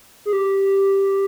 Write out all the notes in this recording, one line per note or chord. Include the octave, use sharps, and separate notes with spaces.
G#4
G4